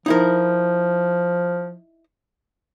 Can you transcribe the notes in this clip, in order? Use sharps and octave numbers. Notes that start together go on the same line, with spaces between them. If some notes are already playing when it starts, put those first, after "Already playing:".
F3 D#4 E4 A#4